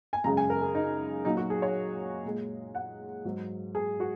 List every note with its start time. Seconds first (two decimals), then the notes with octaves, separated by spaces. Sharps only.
0.13 G#5
0.24 F#2 C#3 G#3 A#5
0.37 G#5
0.50 A#4
0.61 G#4
0.75 D#4
1.24 A#2 F#3 D#4
1.37 F#4
1.50 G#4
1.62 C#5
2.25 A#2 G#3
2.75 F#5
3.25 G#2 F#3
3.75 G#4
4.00 F#4